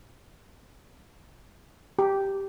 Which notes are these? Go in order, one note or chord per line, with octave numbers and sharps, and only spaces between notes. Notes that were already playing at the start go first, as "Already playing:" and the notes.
G4